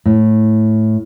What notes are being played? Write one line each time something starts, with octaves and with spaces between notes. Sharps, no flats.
A2